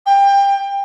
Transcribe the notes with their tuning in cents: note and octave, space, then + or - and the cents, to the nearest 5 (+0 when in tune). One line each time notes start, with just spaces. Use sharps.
G5 +25